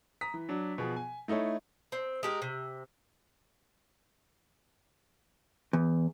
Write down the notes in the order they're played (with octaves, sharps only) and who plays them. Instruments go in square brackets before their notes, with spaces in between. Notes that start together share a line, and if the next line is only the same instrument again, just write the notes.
[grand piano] A#5 D#6 B6
E3
F#3 D4
B2 F3 G#4
G#5
A3 D#4 E4 A4 C#5
[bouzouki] C4
G#3 G4 A#4
C3
[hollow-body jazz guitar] E2